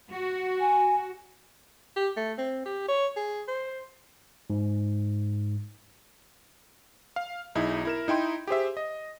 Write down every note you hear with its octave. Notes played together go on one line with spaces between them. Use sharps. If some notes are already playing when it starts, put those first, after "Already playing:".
F#4
G#5
G4
A3
C4
G4
C#5
G#4
C5
G#2
F5
B1 D#4 E4 G#4
E4 A#4 E7
D#4 E4 G5 C6
G4 G#4 C5 E5
D#5